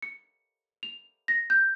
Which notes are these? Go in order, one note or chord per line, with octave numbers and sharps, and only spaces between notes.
C#7
F7
A#6
G6